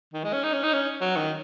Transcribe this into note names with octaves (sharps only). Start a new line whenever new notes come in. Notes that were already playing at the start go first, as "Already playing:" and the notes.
D#3
G#3
C#4
D#4
C#4
D#4
C#4
F#3
D#3